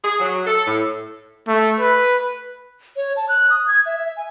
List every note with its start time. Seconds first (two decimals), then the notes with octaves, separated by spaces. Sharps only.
0.04 G#4
0.20 F#3
0.47 A4
0.67 A2
1.47 A3
1.80 B4
2.96 C#5
3.17 A5
3.29 F#6
3.50 D#6
3.67 G#6
3.86 E5
3.99 E5
4.17 G#5